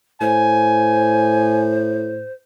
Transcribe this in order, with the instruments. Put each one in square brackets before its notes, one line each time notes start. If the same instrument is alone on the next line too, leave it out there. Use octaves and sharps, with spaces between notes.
[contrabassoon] A2 [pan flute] C5 [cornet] G#5